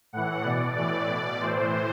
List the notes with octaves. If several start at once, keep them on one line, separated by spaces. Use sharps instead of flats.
A2 E3 F#5
B2 D5
A2 E3 D5
B2 D5
A2 E3 C5